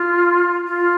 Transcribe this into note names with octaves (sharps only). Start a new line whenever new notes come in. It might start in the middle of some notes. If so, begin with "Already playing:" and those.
Already playing: F4
F4